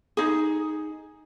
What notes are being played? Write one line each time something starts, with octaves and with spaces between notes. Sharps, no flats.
D#4 G#4